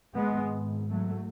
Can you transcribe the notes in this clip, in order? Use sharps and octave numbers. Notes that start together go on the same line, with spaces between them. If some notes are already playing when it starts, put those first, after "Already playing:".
G#1 G#2 G#3 B3
F#3 A3